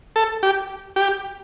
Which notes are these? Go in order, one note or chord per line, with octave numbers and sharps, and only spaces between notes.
A4
G4
G4